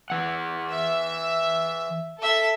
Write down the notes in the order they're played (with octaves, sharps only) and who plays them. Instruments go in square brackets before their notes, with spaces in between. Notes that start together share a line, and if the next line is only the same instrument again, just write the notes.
[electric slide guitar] E3 F#5
[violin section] E5
A4 E5